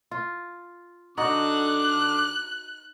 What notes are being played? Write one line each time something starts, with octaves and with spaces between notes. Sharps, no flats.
F4
D3 D#4 F#4 D6 F#6